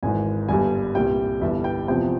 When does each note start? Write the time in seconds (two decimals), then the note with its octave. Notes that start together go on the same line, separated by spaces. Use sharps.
0.03 G#1 G#2 E3 G#5
0.48 G1 G2 G3 G#5
0.95 C2 A#2 G3 G5
1.41 G1 G2 E3 G3 E5
1.64 G5
1.88 E2 C3 F3 G5